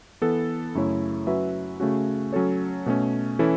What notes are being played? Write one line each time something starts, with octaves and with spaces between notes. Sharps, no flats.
E3 B3 A4
F#2 C#3 A3 E4 C#5
F#3 C#4 F#4 B4 E5
C#3 A3 C#4 F#4
F#3 C#4 A4 C#5
B2 A3 C#4
E3 C#4 E4 A4